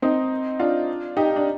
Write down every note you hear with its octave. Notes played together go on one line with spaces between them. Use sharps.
C4 D#4
D4 F4
D#4 G4
D4